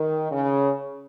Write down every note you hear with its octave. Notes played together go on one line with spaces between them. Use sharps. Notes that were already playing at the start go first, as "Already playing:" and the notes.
Already playing: D#3
C#3